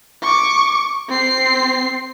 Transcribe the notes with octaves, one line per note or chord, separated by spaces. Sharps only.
C#6 D6
C4 C7